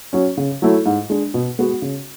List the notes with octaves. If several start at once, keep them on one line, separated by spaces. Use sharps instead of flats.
F#3 C#4
C#3
F#3 A3 E4
G#2
G#3 D4
B2
G#3 B3 F#4
C#3